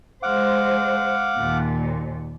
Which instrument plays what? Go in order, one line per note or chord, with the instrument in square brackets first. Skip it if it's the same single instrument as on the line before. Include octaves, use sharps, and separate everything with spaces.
[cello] G#3 C5 [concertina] F5 F#5 D6
[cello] D#2 A#2